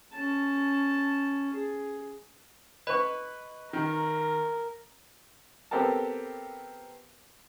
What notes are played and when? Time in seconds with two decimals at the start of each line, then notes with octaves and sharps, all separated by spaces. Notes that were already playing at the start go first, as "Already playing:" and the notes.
0.13 C#4 A5
1.54 G#4
2.87 B4 D#5 C#6
3.73 D#3 A#4
5.71 B3 C4 G4 A4 A#4 A5